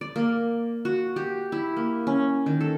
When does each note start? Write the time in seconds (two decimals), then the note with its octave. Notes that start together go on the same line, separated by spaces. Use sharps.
0.01 D5
0.16 A#3
0.85 F#4
1.16 G4
1.52 E4
1.76 A#3
2.07 C#4
2.46 D#3
2.61 A4